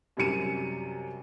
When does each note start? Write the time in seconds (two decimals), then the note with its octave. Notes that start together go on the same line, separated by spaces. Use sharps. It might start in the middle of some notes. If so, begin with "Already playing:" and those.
0.17 F#2 C3 G3 C#7 D#7